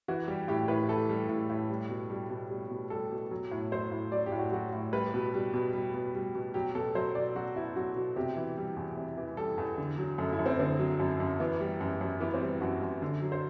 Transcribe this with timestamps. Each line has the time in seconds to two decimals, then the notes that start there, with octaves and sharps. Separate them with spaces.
0.08 E3 F#4
0.28 G3 G4
0.48 A2 G4
0.68 A2 B4
0.88 E3 A4
1.09 G3
1.29 A2
1.50 A2
1.70 G3
1.89 B2
2.10 G3
2.30 B2
2.51 G3
2.70 B2
2.90 G3 A4
3.11 B2
3.31 F#3
3.51 A2
3.72 F#3 C5
3.91 A2
4.12 F#3 D5
4.26 G4
4.32 A2
4.39 F#4
4.52 F#3 F#4
4.73 A2
4.93 G3 B4
5.14 B2
5.34 G3
5.54 B2
5.73 G3
5.94 B2
6.15 G3
6.35 B2
6.54 F#3 G4
6.75 B2 A4
6.95 F#3 C5
7.15 B2 D5
7.35 F#3 F#4
7.56 B2 E4
7.76 F#3 F#4
7.96 B2
8.16 C3 G4
8.36 E3
8.57 G3
8.77 E2
8.97 C3
9.17 E3
9.37 G3 A4
9.58 E2
9.78 D3
9.98 F#3
10.18 F#2 A4
10.33 E4
10.39 F#2
10.46 C4
10.59 D3 C4
10.80 F#3
11.00 F#2
11.20 F#2
11.40 E3 B3
11.60 G3
11.81 F#2
12.01 F#2
12.20 E3 B3
12.34 C4
12.41 G3
12.61 F#2 F#4
12.82 F#2
13.02 D3
13.22 F#3
13.32 C5